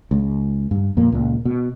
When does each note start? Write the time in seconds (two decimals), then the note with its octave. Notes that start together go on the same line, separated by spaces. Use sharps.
0.11 C#2
0.71 G2
0.97 F2 A#2 A#3
1.12 C#2 A#2
1.45 B2